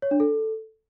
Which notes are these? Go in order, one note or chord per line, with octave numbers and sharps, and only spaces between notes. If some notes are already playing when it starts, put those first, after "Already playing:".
C#5
D4
A4